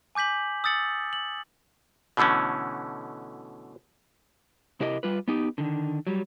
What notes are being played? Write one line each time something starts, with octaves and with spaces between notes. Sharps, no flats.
G#5 D6 G6 B6 F#7
D#6 E6 A6 C#7 F#7
F#7
B2 D3 E3 A3 C#4
C3 E4 G4 A#4 D#5
G3 F4 B4
B3 D#4 G4
D3 D#3
F#3 G3